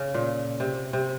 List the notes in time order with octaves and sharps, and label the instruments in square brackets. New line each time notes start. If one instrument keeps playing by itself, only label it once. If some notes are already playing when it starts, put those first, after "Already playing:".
Already playing: [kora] C#3
A#2
C3
C3